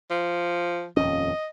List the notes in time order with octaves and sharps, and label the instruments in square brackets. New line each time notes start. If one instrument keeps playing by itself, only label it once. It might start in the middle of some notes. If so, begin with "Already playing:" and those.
[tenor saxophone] F3
[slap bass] D#1 F2 C#4 [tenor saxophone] D#5